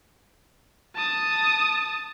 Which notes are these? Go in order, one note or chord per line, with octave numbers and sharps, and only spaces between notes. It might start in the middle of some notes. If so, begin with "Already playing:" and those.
A5 D#6